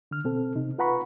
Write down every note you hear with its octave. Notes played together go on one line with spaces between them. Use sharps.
D3 F6
B2 C4 A4
C3 D#4
F4 B4 F#5 A#5 B5 C#6